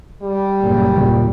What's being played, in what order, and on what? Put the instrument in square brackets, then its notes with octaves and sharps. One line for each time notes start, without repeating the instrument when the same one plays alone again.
[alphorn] G3
[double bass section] F#1 A#2
[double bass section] D#2 [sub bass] A#2